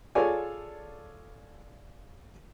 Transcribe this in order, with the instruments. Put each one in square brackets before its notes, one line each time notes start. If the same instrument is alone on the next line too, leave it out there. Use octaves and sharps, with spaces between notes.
[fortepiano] F4 G#4 A4 C#5 D5 G#5